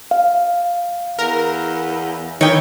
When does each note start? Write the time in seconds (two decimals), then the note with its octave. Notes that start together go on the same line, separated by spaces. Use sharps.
0.11 F5
1.19 E2 A#4
2.41 D#3 E3 C#5 G5